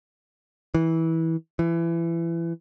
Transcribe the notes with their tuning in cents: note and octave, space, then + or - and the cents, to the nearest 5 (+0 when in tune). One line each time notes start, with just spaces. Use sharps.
E3 -20
E3 +25